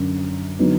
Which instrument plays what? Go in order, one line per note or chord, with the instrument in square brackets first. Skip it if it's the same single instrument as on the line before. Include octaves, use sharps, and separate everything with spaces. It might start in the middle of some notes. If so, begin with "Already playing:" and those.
Already playing: [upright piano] F#2 D3 F#3 D4
D3 F#3 B3 D#4